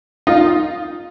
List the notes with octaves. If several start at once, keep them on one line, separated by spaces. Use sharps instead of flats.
D#4 F4